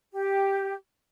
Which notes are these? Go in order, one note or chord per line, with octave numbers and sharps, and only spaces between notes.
G4